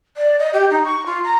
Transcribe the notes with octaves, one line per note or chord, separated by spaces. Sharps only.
D5
D#5
G4
D#4
C#6
F4
A#5